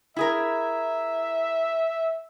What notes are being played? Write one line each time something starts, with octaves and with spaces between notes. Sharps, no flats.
E4 G#4 A#4 E5